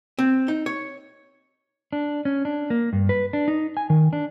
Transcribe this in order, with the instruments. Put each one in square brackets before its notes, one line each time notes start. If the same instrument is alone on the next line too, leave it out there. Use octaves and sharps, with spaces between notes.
[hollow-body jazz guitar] C4
D#4
C#5
[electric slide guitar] D4
C#4
D4
A#3
G2
B4
D4
D#4
G#5
D#3
D4